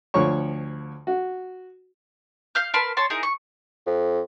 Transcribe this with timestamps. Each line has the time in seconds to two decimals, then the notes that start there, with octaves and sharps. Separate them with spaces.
0.14 D2 F3 C#5 C#6
1.07 F#4
2.55 F5 F6 G6
2.74 A#4 B4 A5 C6
2.97 C#5 A5 C6
3.10 D#4 E4 G#4 A#4
3.23 C#6
3.86 F2